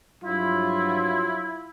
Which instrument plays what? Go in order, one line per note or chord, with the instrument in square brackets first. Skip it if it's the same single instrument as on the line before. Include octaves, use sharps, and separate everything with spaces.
[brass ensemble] G2 F3 F#3 [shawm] E4 [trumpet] F4